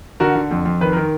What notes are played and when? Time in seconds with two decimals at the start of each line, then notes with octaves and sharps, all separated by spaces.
0.20 D3 F#4 A#4
0.35 D3
0.51 F2
0.65 F2
0.81 D#3 B4
0.93 D#3 A#4